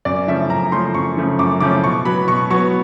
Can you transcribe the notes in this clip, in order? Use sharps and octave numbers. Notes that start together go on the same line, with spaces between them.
F#2 D5
C#3 F3 A3 C#4 E5
F#2 A#5
C#3 F3 A3 C#4 C6
F#2 C#6
C#3 F3 A3 C#4
F#2 D6
C#3 F3 A3 C#4 D6
B2 C#6
F#3 B3 B5
B2 C#6
F#3 B3 C#6